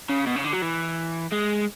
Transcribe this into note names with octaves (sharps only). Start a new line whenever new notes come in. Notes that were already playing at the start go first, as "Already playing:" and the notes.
C#3
B2
C#3
D3
F#3
E3
G#3